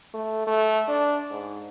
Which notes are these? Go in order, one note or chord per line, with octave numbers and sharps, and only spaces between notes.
A3
A3
D4
G#2